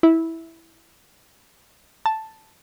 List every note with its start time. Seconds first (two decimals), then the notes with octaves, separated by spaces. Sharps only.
0.03 E4
2.06 A5